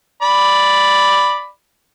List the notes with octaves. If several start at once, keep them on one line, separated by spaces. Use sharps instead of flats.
D5 B5